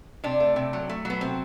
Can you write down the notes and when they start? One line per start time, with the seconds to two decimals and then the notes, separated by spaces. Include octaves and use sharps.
0.24 C3 D4
0.40 A3
0.56 C3
0.73 F#3
0.89 A3
1.05 F#3 B3
1.21 C3 C4